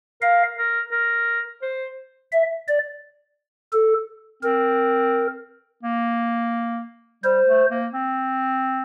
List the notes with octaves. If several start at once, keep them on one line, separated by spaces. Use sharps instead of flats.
A#4 F5
A#4
A#4
C5
E5
D5
A4
C4 A#4
A#3
G3 C5
A3
A#3
C4